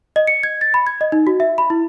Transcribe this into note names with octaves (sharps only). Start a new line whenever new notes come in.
D#5
C#7
G#6
A6
B5
G#6
D#5
D#4
F#4
E5
B5
E4